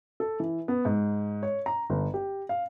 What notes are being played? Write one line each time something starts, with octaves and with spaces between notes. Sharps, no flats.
A4
E3
B3
G#2
C#5
A#5
G1
G4
F5